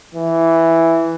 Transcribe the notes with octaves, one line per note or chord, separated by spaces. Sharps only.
E3